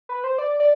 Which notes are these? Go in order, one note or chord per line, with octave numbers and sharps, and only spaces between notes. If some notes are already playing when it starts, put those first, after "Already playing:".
B4
C5
D5
D5